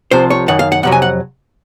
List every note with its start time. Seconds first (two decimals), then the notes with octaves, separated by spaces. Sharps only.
0.11 C2 C3 F3 C5
0.30 C#5
0.48 F#2 D#3 F#5
0.59 F5
0.72 F#5
0.83 F2 C3 F#3 F#5
0.92 G#5
1.02 F#5